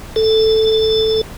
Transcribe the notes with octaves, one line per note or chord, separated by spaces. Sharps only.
A4